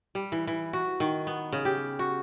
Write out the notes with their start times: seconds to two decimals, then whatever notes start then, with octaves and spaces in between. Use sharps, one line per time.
0.15 G3
0.32 E3
0.47 E3
0.73 F#4
1.00 D#3
1.27 B3
1.52 C#3
1.65 G4
1.99 F#4